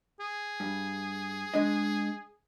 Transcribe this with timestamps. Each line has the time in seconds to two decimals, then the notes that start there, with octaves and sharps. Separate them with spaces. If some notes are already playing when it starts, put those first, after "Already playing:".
0.20 G#4
0.60 G2
1.54 G#3 D4 D#5